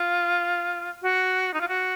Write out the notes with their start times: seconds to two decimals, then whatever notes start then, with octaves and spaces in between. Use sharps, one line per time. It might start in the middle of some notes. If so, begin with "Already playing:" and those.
Already playing: F4
1.02 F#4
1.54 D#4
1.61 F4
1.68 F#4